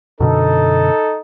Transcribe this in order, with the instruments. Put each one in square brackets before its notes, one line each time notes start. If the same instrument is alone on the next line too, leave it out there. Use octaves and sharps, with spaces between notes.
[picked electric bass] F#2 B2 D3 [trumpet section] D#4 A4